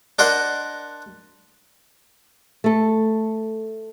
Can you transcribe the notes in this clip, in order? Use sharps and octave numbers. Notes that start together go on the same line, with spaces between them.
D4 A#4 C5 D#5 F#5 C6
A3 A4